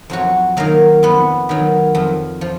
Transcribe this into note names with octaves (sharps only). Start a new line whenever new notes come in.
F2 F#3 F#4
D#3 F#3 A#3 A#4
F2 B3 B4
D#3 F#3
F2
F3